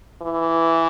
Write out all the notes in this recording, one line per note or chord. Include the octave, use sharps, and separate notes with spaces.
E3